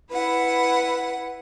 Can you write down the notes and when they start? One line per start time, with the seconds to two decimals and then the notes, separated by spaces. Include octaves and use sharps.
0.10 E4 B4 F#5